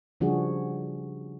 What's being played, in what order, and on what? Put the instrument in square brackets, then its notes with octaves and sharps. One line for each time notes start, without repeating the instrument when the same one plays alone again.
[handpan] C#3 F3 G3 D4 F#4 G#4